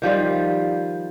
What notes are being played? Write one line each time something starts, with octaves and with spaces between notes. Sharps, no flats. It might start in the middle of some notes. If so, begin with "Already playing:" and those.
D#3 F3 G3 F4